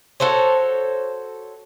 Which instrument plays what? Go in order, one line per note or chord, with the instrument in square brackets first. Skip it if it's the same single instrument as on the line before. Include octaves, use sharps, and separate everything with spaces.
[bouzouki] F#4 A4 C5 C#5